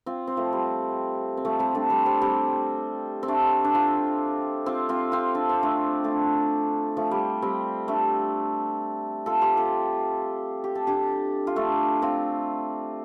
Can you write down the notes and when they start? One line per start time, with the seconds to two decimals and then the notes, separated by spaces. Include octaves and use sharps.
0.06 C4 F4
0.27 C4
0.37 F3 A3
0.53 G3
1.37 C4
1.45 F3 A3
1.59 G3 C4
1.75 A3 D4
1.90 G3 C4
2.06 G3 C4
2.22 G3 C4
3.23 C4
3.28 A3 D4
3.64 D4
3.75 C4 F4
4.66 C4 F4
4.89 C4 F4
5.12 C4 F4
5.35 D4
5.49 C4
5.63 A3 D4
6.04 A3 D4
6.97 F3 A3
7.11 G3
7.42 G3 C4
7.88 A3 D4
9.26 F4 A4
9.41 G4 C5
9.57 F4 A4
10.64 G4
10.75 A4
10.87 D4 G4
11.47 F4
11.56 A3 D4
12.02 C4 F4